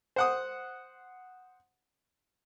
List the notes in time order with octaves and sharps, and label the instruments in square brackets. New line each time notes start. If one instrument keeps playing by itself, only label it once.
[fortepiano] C5 F#5 D#6